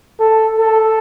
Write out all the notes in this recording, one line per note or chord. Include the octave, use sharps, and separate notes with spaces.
A4
A4